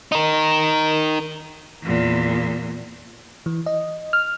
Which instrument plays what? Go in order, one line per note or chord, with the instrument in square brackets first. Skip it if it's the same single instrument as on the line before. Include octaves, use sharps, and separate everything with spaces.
[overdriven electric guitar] D#4 A#4
[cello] E2 A#2
[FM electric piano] E3
D#5
F6